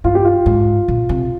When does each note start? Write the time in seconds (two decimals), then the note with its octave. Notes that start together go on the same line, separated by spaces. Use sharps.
0.04 G2 F4
0.15 G4
0.24 F4
0.46 G#2
0.88 A#2
1.09 C3